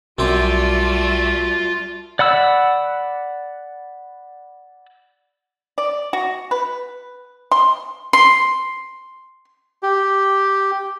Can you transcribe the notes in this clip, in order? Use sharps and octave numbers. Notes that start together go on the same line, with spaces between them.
B1 F#2 G3 A3 C4 F4 D5 D6
D5 F#5 B5 E6
D5
F#4
B4
C6
C6
G4